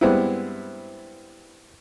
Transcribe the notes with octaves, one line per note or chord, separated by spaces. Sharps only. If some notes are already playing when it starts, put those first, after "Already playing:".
G2 G#3 B3 C4 E4